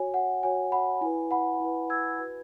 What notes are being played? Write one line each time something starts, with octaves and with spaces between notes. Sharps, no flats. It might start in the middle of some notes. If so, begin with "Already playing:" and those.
Already playing: F#4 C#5 G#5
F#5
F#4 C#5 G#5
F#5 B5
E4 B4 G#5
F#5 B5
E4 B4
E6 G#6
F#4 B4